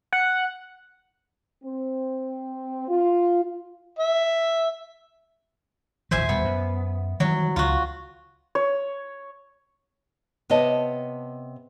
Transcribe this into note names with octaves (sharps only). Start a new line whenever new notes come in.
F#5
C4
F4
E5
D1 G#1 E3 C5 E5 G#5
D#1 G3 B3
F#2
D#3 E3 F#3 G3
C#2 F4 F#4
C#5
C3 B3 C#5 D#5 A5